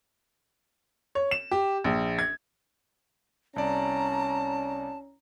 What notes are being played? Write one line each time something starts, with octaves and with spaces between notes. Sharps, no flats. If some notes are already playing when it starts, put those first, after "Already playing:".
C#5
E7
G4
A#1
G#6
C2 C#4 D5 A5 A#5